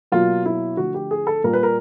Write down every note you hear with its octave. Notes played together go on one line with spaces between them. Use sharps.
B2 F#3 A#3 F4
E4
D3 F3 A3 F#4
G4
G#4
A4
A#2 G3 A#3 A#4
B4
A#4